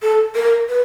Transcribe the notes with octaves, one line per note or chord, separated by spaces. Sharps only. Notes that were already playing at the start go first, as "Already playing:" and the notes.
A4
A#4
B4